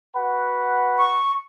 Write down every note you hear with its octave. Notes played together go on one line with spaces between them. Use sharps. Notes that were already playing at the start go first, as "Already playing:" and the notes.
F#4 B4 F#5
C#6